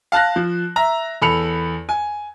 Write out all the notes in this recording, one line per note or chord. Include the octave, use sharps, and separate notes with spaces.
F5 A5 F#6 A#6
F3
E5 A#5
E2 A4 B5 C#7 F7
G#5